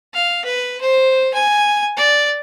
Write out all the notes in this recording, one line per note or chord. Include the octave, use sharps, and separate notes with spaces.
F5
B4
C5
G#5
D5